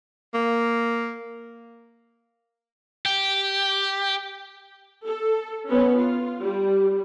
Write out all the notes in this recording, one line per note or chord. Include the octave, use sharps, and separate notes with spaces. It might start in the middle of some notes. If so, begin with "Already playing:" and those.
A#3
G4
A4
B3 C#4
F4
G3